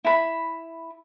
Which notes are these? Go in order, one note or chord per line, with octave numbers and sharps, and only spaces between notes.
E4 B5